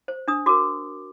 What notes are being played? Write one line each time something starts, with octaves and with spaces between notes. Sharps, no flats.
C5
D4 D#6
F#4 A#4 D6